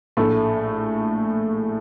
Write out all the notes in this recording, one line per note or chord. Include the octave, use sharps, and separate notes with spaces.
A#1 A2 A3